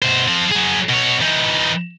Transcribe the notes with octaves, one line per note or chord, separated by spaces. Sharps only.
B2 C5
F3 C4
F#3 G#4
B2 C#5
E3 D#4